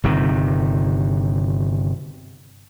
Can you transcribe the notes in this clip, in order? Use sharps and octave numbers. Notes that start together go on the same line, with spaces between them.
G1 C3 D#3